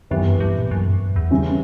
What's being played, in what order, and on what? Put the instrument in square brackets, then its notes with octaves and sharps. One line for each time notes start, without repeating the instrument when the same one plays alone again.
[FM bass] F#2 [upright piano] E3 B3 E4 G4
[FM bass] G2
G2
A#2
F#2
G2
F#2
E2
[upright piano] C#3 E3 G3 C#4